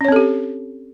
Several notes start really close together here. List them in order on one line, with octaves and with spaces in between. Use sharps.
C#4 C#5 C4 A4 G4